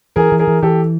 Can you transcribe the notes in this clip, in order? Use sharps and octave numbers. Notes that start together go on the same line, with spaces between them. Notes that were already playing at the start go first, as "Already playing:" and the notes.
E3 G#4 A#4
E3
G#4 A#4
E3
E3 G4 A4